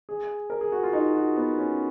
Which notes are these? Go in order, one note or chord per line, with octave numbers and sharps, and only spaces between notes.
G#4
A#4
G#4
F#4
F4
D#4
F#4
B3
C#4